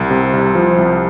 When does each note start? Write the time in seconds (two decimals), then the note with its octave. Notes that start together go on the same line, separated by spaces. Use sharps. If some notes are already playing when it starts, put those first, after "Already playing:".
Already playing: C2
0.11 C3
0.33 C2
0.55 F3
0.78 C2